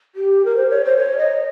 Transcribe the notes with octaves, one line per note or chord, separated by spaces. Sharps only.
G4
A#4
C5
C#5
C5
C#5
D#5